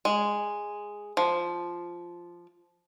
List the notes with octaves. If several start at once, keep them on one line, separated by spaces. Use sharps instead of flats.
G#3
F3